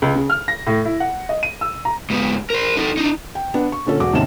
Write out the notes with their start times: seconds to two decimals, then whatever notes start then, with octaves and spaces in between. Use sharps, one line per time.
0.02 C#2
0.15 C#3
0.30 F6
0.48 A#6
0.67 A2
0.85 E4
1.00 F#5
1.29 D#5
1.43 D#7
1.61 E6
1.85 A#5
2.10 G#2 B3
2.50 A#4 C5
2.77 D#4 A4
2.97 D4 D#4
3.35 G5
3.54 B3 D4 B4
3.72 C#6
3.86 A#2 D3 C#4 A4
4.00 E1 F#4 D6
4.13 D#2 G#2 C3 C#4 A5 E7